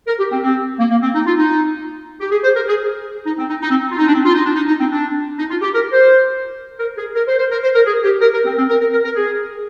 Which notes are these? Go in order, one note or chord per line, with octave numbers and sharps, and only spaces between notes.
A#4
G4
C4
C4
A#3
A#3
C4
D#4
F4
D#4
G4
G#4
C5
A#4
G#4
D#4
C4
D#4
D#4
C4
F4
D#4
D4
C4
F4
D#4
D4
D#4
D#4
C4
D4
D#4
F4
G4
A#4
C5
A#4
G#4
A#4
C5
C5
A#4
C5
A#4
G#4
G4
A#4
A#4
C4
C4
A#4
A#4
A#4
A#4
G#4